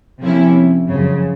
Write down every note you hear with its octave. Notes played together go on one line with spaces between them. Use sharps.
C3 F3 A#3 C#4 E4
F#2 C#3 F3